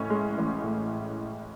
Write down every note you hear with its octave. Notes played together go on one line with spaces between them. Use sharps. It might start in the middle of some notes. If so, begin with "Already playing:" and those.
Already playing: A1 A2 C#4
G#3
A1
A2